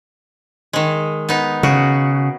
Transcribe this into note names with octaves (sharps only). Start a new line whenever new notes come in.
D#3 G#3
B3 D#4
C#3 F#4